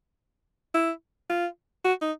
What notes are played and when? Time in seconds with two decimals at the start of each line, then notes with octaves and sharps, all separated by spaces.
0.75 E4
1.30 F4
1.85 F#4
2.02 D#4